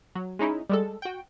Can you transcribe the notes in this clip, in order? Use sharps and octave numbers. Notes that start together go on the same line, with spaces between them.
F#3
G#3 C#4 D#4 E4
G3 G#3 A4
F#4 G5